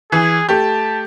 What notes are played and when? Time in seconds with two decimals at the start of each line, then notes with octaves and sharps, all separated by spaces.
0.12 E3 G#4
0.49 A3 G4 A5